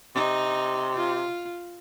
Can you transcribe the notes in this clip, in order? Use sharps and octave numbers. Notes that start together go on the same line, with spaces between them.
C3 D#4
F4